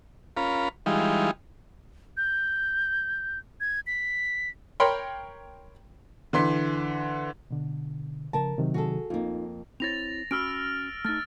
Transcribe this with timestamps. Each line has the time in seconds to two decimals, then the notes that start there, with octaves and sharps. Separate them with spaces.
0.37 C#4 F4 A#4 B5
0.86 E3 G3 G#3 D#4 F4
2.17 G6
3.61 G#6
3.87 B6
4.80 A#4 C#5 G5 B5 C6
6.33 D3 E3 C6 B6
7.51 B2 D3
8.33 C#3 F3 A#4 A5
8.58 C3 D#3 F#3
8.74 F#4 G#4 A4
9.10 F2 A#3 D#4 F4
9.80 C4 E4 C#5 A6 A#6 F7
10.31 C#4 F#4 B5 E6 F6 D7
11.05 A3 D#4 F6 A6